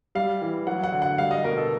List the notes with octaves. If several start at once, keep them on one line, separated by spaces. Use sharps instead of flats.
G3 F5
E3
F#3 F#5
F#5
D3
F#5
G3 F5
D#5
B2 A#4
A4